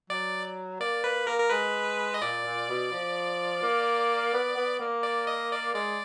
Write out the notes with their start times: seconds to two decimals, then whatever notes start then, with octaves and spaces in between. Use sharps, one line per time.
0.10 F#3 D5
0.80 A#3 D5
1.04 A#3 B4
1.27 A#3 A#4
1.39 A#4
1.50 G#3 B4
2.14 D#5
2.21 A#2 D5
2.45 A#2
2.69 B2
2.92 F3
3.62 A#3
4.33 B3
4.57 B3
4.80 A#3
5.03 D5
5.27 D#5
5.51 D5
5.74 G#3 D5